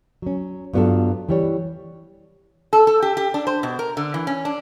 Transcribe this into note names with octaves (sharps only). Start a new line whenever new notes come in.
F#3 C#4
G2 F#3 B3 D#4 F4 A4
E3 G3 C#5
A4
A4
G4
G4
D4
C5
B2
A#4
D3
E3
C#4
D4